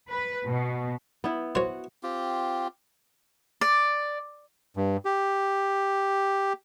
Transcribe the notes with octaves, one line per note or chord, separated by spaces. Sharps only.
B4
B2
B3 E4
F#4 C5 C#5
C4 F4 G4
D5
G2
G4